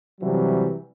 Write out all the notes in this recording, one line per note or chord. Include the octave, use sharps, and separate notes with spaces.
C3 E3 F#3 G3